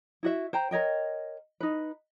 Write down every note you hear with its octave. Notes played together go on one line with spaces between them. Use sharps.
E4 F#4 E5
C5 G5 A#5
A#4 C#5 D#5 G5
D#4 B4